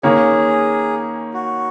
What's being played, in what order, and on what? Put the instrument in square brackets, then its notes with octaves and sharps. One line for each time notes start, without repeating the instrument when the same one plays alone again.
[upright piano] D#3 A#3 C#4 [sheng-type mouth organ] G#4
[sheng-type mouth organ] F#4